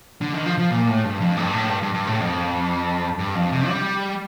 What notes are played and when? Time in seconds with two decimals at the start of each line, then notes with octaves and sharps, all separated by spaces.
0.21 D3
0.34 D#3
0.46 F3
0.58 F3
0.71 A#2
0.87 A2
1.04 G2
1.20 F2
1.37 G2
1.53 A2
1.69 G2
1.83 G2
1.94 G2
2.07 A2
2.20 F2
3.19 G2
3.35 F2
3.52 C3
3.68 G3